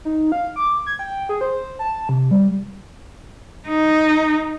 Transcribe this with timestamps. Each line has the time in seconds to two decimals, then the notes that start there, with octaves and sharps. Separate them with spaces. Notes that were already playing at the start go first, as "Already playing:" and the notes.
0.05 D#4
0.32 F5
0.56 D6
0.86 G#6
0.99 G5
1.29 G#4
1.41 C5
1.79 A5
2.09 C3
2.31 G3
3.68 D#4